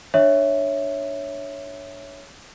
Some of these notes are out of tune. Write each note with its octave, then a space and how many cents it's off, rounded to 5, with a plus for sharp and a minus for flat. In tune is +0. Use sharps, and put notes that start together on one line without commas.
D4 +0 C#5 +0 E5 +0